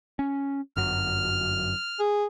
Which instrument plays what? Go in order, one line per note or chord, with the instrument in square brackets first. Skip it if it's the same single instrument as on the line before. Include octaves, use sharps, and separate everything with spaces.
[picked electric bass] C#4
[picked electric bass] G1 F#2 F#3 [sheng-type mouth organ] F6
[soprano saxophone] G#4